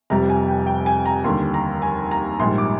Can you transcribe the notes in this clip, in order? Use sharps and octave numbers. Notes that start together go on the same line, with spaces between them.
F1 F2 C3 G3 A#5
G#5
G5
G5
G#5
A#5
D#2 D3 G3 C6
A#5
G#5
A#5
A#1 G#2 G3 C6
D6